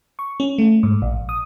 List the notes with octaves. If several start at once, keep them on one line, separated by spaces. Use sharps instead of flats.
C#6
C#4
A3
G#2
A#1
D#6